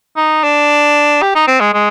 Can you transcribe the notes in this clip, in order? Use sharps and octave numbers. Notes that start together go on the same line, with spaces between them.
D#4
D4
G4
D#4
C4
G#3
G#3